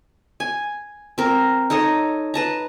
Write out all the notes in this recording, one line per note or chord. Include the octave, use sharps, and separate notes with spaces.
G#5
C4 A#4
D#4 A4 C#5 D#5
B4 A5 A#5